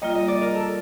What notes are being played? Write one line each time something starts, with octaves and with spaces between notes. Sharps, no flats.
G3 A#3 F4 D#5
D#5
D5
A#4
A4